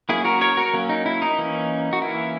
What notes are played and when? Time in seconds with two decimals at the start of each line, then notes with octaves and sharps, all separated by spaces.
0.09 F#3 A#3 C#4 E4 G#4
0.25 F#4 A#4
0.41 A#4 C#5
0.57 F#4 A#4
0.74 F#3 A#3 C#4
0.89 D#4
1.06 E4
1.22 D#4
1.38 E3 A#3 C#4
1.93 F#4
2.02 E3 A#3 C#4 E4